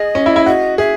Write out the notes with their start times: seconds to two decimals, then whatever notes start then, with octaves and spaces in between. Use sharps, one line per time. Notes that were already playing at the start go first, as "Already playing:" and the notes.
Already playing: G#4 D#5
0.15 C#4
0.26 E4
0.36 E4
0.46 F#4 D#5
0.78 G#4 E5